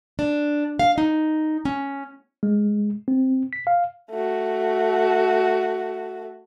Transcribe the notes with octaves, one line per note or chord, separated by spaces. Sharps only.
D4
F5
D#4
C#4
G#3
C4
B6
F5
A3 F#4